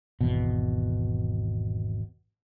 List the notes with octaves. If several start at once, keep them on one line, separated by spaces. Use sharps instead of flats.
G#1 E2 B2